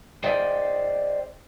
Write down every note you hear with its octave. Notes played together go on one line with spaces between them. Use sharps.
G#4 C5 D5 D#5 G5